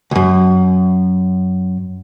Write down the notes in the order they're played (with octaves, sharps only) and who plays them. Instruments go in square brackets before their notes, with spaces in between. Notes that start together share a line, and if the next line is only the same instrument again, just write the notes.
[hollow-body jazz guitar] C#2 F#2